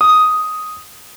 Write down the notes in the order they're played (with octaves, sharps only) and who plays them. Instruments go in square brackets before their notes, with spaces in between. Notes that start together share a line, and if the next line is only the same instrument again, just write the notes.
[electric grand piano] D#6